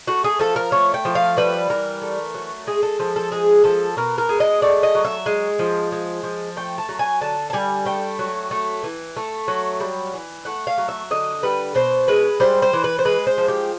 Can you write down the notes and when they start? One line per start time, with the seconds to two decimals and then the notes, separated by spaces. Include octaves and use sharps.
0.08 A3 F#4
0.24 G#4
0.39 F3 A4
0.56 A#4
0.72 A3 C#5
0.94 G5
1.05 F3
1.15 F5
1.37 G3 B4
1.70 E3 A#4
2.02 A3
2.34 F#3
2.67 G#3 G#4
2.83 A4
3.00 F3 A4
3.16 A4
3.32 G#3 G#4
3.64 F3 A4
3.97 B2 A#4
4.18 A#4
4.29 G#3
4.40 D#5
4.62 A3 D5
4.83 D#5
4.95 F#3
5.05 E5
5.26 G#3
5.59 F3
5.92 G#3
6.23 F3
6.57 A3 G5
6.78 A5
6.89 F#3
6.99 G#5
7.21 D3 A5
7.50 A5
7.53 G3 G#5
7.85 A3 G5
8.19 F#3
8.51 A3
8.84 E3
9.17 A3
9.48 F#3
9.80 G3
10.14 E3
10.45 A3 F#5
10.67 F5
10.78 F#3
10.88 E5
11.11 D3 D#5
11.43 G3 B4
11.75 B2 C5
12.08 G#3 B4
12.40 G3 C5
12.62 C5
12.73 E3
12.84 B4
12.99 C5
13.05 G#3 B4
13.27 C5
13.38 F3
13.48 G4